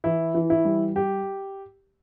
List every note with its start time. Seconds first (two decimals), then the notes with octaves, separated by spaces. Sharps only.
0.04 E3 E4
0.35 E3
0.50 E4
0.65 G3
0.96 G4